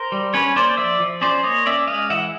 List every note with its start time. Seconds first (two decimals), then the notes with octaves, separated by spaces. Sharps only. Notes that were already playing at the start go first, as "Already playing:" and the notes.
Already playing: A#4 C5
0.12 G3
0.34 C#4 B4 C#5
0.56 A#3 C5 D5
0.77 F3 D5 E5
1.00 F3
1.21 C#4 C5 D5
1.43 A#3 C#5 D#5
1.66 C#4 D5 E5
1.87 G#3 D#5 F5
2.10 E3 E5 F#5